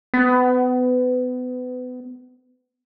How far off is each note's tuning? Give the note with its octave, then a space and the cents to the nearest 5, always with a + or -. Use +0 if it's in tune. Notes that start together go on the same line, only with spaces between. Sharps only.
B3 +30